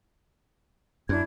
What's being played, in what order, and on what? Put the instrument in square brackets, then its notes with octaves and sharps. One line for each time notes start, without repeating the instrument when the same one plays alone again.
[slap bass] F#2 [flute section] D4 E4 G#6